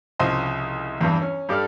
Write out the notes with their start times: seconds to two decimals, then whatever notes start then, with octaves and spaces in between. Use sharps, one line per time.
0.19 C2 C#3 F3 C5 D#5 C6
1.01 E2 G2 E3
1.22 C#4
1.49 G2 G4 A4 D5 F6